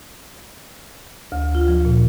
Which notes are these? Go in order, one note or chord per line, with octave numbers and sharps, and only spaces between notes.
D2
F4
F3
A#2